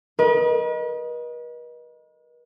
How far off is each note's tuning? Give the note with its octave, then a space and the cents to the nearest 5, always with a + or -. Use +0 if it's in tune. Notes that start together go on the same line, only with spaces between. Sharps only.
B4 -45 D#5 +0